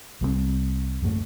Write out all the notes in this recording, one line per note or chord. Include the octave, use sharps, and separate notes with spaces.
C2 G3 G#3 C4
D1 F#2 G#3 A3